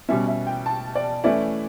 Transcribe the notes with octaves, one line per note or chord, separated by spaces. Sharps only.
B2 G3 C#4 E5
E5
G5
A5
D5
E3 A3 C#4 E4 D5